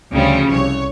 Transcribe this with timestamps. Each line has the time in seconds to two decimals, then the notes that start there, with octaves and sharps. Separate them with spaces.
0.13 D2 C#3 F3 G3
0.49 C2 C#5